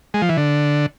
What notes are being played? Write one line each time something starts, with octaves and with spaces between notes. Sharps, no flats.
G#3
F3
E3
D3